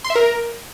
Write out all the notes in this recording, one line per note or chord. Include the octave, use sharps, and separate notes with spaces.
C6
E5
A#4